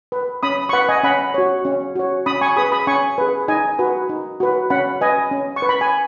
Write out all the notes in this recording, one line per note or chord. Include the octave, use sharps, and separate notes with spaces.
B4
C#4 B5 D#6
C#6
B4 F#5 B5
D#5 G#5
C#4 F#5 B5
F#4 C#5
C#4
F#4 C#5
C#4 B5 D#6
G#5 C#6
G#4 B4 B5 D#6
B5 D#6
C#4 G#5 C#6
G#4 B4
D#4 D#5 G#5
F#4 B4
D#4
F#4 B4
C#4 F#5 B5
B4 D#5 G#5
C#4
C#6
B4
B5
G#5